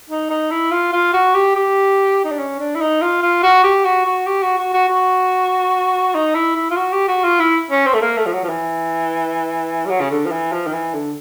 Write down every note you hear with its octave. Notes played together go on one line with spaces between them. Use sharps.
D#4
D#4
E4
F4
F4
F#4
G4
G4
D#4
D4
C#4
D4
E4
D#4
F4
F4
F#4
G4
F#4
F#4
G4
F#4
F#4
F#4
F#4
D#4
E4
E4
F4
F#4
G4
F#4
F4
E4
C#4
C4
A3
A#3
A3
F3
F#3
F3
E3
G3
F#3
C#3
D3
F3
E3
F3
D#3
E3
D3